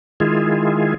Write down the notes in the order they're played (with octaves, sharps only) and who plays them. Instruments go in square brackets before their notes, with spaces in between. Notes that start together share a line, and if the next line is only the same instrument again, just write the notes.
[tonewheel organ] D#3 G#3 E4 F4 G#4